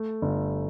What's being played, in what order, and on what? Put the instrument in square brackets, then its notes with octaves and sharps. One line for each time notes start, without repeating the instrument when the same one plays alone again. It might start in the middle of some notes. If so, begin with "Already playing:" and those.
Already playing: [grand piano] A3
G1